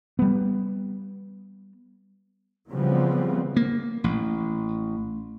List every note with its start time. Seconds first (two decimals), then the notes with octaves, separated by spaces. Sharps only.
0.19 G3 B3
2.71 C#3 E3 F3 G3 B3 C4
3.56 A#3
4.04 A1